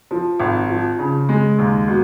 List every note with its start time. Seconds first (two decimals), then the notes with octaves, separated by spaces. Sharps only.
0.11 F3
0.40 G#1
0.70 F3
0.99 C#3
1.29 G#3
1.59 D#2
1.88 B2